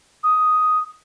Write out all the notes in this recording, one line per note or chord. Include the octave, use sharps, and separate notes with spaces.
D#6